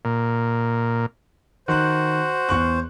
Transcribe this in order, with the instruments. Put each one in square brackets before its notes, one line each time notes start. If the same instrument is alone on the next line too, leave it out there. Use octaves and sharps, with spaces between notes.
[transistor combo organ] A#2
[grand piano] D#3 F#6 [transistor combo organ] F#4 [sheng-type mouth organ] C5
[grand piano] E2 C#6 F#6